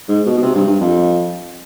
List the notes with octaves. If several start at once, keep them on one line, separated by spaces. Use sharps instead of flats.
G#2
B2
B2
C3
G2
G2
F2